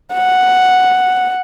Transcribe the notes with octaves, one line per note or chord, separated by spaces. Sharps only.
F#5